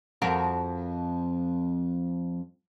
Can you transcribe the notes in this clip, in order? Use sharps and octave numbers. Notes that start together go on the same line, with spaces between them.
F2 F#4 A#4